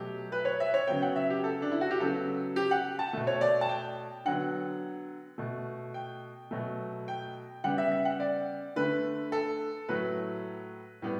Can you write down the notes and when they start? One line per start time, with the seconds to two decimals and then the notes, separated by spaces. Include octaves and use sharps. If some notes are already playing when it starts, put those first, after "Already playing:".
Already playing: B2 F#3 A3 G4
0.32 B4
0.45 C#5
0.60 E5
0.74 C#5
0.87 C#3 F#3 B3 G5
1.02 F#5
1.16 E5
1.30 G4
1.44 A4
1.62 D4
1.71 E4
1.81 F#4
1.91 G4
2.00 C#3 F#3 B3 A4
2.56 G4
2.71 F#5
2.99 A5
3.13 B2 A3
3.27 C#5
3.41 D5
3.61 A5
3.69 G5
4.25 D3 F#3 B3 F#5
5.38 B2 A3
5.94 G5
6.51 B2 F#3 A3
7.08 G5
7.64 C#3 G3 B3 F#5
7.78 E5
7.92 E5
8.05 F#5
8.20 D5
8.76 D3 A3 B4
9.32 A4
9.89 A2 F#3 A3 B4
11.02 A2 G3 B3